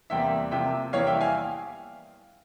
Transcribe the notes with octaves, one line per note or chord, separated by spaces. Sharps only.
E2 C3 G3 A#3 E5 G5
C3 F3 A#3 E5 G5
E2 E3 G3 A#3 C#5 F5
E5 G5
F5 G#5